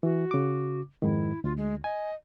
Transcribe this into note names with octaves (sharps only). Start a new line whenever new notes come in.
E3 F#4
C#3 D6
F2 G#2 D#3 E4
D2 F4
G#3
D#5 G#5